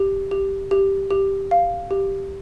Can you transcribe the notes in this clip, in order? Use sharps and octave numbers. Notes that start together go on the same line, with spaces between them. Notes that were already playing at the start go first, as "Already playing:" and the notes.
Already playing: G4
G4
G4
G4
F5
G4